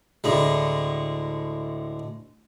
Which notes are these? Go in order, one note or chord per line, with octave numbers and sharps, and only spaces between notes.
D2 A2 G#3